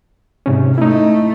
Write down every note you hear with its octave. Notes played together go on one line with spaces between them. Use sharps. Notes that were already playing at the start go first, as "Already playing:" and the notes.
G#2 C3 C#4
A3 D#4 E4